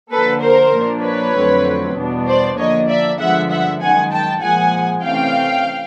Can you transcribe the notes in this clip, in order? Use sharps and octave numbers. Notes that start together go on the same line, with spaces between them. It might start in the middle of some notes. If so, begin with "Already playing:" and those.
D3 F3 A#3 A4 B4
A#4 C5
A#2 F3 A#3 D4
B4 C#5
F2 D3 F#3 A3 C4
E2 B2 G3 B3 D4
C5 D5
D3 F3 A#3 D4 C#5 D#5
D5 E5
G2 D3 F3 G#3 B3 E5 F#5
E5 F#5
F#2 D#3 G#3 F#5 G#5
G5 A5
A#2 F3 G#3 F#5 G#5
C3 E3 A3 C#4 F5 G5